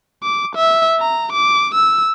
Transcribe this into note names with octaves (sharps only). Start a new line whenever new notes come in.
D6
E5
A#5
D6
E6